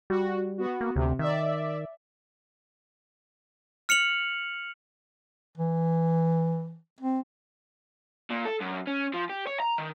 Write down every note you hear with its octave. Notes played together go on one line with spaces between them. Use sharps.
G3 F#4
B3 F#4
A#3
D2 C3
D#3 D5 E5
F6 C#7 F7 F#7
E3
C4
A#2
A4
F#2
C#4
F3
G4
C#5
A#5
D#3